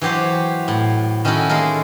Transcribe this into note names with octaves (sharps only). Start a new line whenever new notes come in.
E3 F#3 G4 C5 C#5
A2
D#3 C#4 E4 F#4 A4 A#4
G#3 A#3 A4 A#4